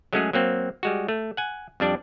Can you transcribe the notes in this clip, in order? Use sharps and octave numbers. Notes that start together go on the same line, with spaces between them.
F#3 G#3 A3 C#4 F#4 G#4
F#3 A#3 C4
G3 G#3 F#4
A3
F#5 G#5
F2 G3 D4 D5